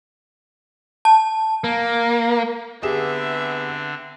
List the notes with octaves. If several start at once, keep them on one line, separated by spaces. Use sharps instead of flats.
A5
A#3
D3 B3 C4 D4 G4 G#4 E5 E7